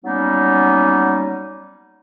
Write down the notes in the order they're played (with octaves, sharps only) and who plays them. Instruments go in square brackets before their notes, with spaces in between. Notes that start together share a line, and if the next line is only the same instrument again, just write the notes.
[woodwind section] F#3 G3 A#3 B3 C#4 D#4